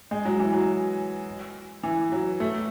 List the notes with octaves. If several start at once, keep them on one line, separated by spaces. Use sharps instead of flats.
G#3
F#3
E3
F#3
E3
F#3
A3